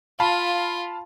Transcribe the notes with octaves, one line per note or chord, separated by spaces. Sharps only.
F4 F5 A5 B5